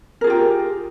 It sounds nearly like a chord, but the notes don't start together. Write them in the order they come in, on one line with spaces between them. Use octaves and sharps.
A#4 G#4 F4 G4